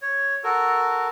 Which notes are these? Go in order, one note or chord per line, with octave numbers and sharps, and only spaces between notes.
C#5
F#4 A4 A#4